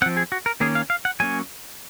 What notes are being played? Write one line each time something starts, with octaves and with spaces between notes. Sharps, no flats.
F3 C4 F#5
G#4
F#4
A#4
D#3 A#3 C#4 G#4
F5
F5
F#5
F#3 A#3 C#4 G#5